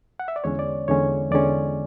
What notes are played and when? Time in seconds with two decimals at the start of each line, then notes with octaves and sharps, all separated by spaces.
0.20 F#5
0.28 E5
0.36 D5
0.44 E2 D3 G#3 C#4 C#5
0.59 D5
0.88 E2 D3 G#3 C#4 C#5
1.31 E2 D3 G#3 C#4 D5